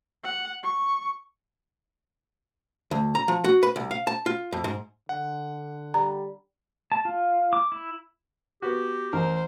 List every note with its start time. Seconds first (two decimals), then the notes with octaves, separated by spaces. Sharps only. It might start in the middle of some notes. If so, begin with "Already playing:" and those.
0.24 F#5
0.63 C#6
2.91 D2
3.15 A#5
3.28 F3
3.44 F#4
3.63 B4
3.76 C2
3.91 F5
4.07 A5
4.26 F4
4.52 F2
4.64 G#2
5.09 D3 F#5
5.94 G3 A#5
6.92 A5
7.05 F4
7.53 D6
7.72 E4
8.62 B3 F#4 G4
9.13 A1 A#4 C5